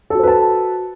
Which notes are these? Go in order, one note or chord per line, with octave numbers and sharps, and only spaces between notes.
F#4 A4 B4 C5 A5